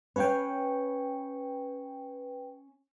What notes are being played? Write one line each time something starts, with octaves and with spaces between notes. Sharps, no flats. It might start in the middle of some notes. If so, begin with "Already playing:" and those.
C#4 B4 C#5 F5 G5